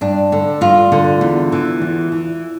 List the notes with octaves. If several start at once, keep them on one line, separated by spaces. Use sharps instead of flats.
G2 D4
D3
G2 F4
D3
E2
E3
E2
E3